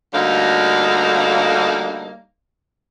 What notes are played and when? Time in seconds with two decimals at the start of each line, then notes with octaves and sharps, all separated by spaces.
0.13 D2 D3 G3 A#3 D#4 F5